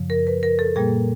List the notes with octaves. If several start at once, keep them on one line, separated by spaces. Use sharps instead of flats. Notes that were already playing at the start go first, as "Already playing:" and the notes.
Already playing: F#2 C#3 F3
A#4
B4
A#4
A4
A#2 G3 A#3 G#4